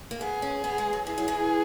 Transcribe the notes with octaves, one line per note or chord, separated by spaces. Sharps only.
A#3
B3 G#4
C#4
B3
G#3
F#3
E3 G#4
F#3
E3